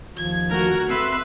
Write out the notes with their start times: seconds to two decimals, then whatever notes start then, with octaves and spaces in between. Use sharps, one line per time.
0.16 D#2 F3 G#6
0.50 D3 A3 F#4 A#4 A#5
0.89 C4 A4 B4 E5 C6 E6